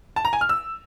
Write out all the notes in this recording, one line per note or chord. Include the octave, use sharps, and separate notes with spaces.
A5
A#5
G#5
F6
E6